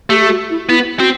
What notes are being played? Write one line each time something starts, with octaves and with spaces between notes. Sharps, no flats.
A3 G4
G4
F#4
E4
B3 E4
C4 F#4